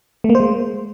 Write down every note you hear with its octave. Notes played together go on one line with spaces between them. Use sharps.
A3
A#3
C5
G#3